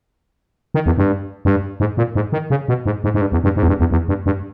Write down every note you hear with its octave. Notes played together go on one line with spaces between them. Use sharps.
D#3
E2
G2
G2
G#2
A#2
G#2
D#3
C#3
B2
G#2
G#2
G#2
G2
E2
G2
G#2
E2
G2
E2
E2
G2
G2